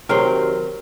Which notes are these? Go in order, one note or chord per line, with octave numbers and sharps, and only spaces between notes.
C3 D#3 F#3 A#4 C5